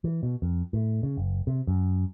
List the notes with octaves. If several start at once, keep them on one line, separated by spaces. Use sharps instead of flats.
E3
B2
F2
A2
C#3
F#1
C3
F#2